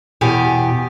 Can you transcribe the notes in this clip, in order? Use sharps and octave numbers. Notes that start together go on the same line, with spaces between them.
E2 B2 G4 G#5